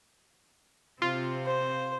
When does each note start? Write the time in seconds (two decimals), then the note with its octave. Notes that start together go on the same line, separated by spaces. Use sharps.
1.02 C3 C4 F4
1.46 C5